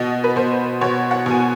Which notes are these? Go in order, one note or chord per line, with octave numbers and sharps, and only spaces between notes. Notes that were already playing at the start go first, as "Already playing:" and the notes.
Already playing: B2 D#5
B4
B2 C5
B2 C#5
F#5
B2 G#5